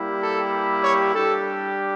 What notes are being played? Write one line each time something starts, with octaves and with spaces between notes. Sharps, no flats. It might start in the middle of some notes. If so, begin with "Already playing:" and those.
Already playing: G3 A#3 E4 G4
A4
C#5
G3 D4 G4 A4